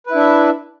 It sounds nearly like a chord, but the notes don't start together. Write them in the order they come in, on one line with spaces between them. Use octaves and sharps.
B4 E4 D4 E5